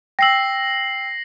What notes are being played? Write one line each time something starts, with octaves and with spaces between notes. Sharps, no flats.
G5 E6 A#6 C7 F#7